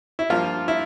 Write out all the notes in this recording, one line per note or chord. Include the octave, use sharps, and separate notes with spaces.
E4
G2 F3 A#3 F4
E4